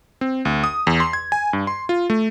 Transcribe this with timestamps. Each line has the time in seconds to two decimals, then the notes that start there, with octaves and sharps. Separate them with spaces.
0.21 C4
0.45 D2
0.64 D#6
0.87 E2
1.00 C6
1.13 G#6
1.32 G#5
1.53 G2
1.67 C6
1.89 F4
2.10 A3